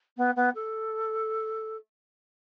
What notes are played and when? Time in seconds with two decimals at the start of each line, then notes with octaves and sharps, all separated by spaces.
0.17 B3
0.36 B3
0.55 A4